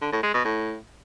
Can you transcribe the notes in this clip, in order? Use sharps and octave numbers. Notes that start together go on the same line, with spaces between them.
D3
A2
G#3
B2
A2